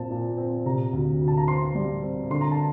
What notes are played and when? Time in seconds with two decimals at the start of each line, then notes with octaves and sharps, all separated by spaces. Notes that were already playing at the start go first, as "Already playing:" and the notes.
Already playing: A#2 C4 A5
0.11 A#2
0.37 C4
0.66 C3 A#5
0.93 D2
1.20 D2
1.28 A5
1.37 A#5
1.48 C4 C6
1.75 G3
2.03 C4
2.30 D3 C6
2.41 A#5
2.51 A5